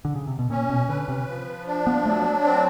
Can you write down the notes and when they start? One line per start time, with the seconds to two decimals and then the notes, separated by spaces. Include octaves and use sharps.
0.05 D3
0.16 C#3
0.27 C3
0.39 B2
0.50 A#2 C#4
0.70 B2
0.89 D3 B4
1.08 C3
1.28 F3
1.67 D4
1.87 B3
2.06 F#3 A3
2.45 C4